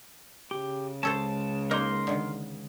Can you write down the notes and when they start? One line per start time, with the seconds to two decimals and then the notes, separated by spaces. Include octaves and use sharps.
0.51 C#3 G4
1.03 C#2 G#3 C#4 A4 C5 A5
1.71 A#3 D#4 A#4 C6
2.07 D3 D#3